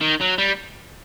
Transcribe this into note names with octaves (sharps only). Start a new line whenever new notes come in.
D#3
F#3
G3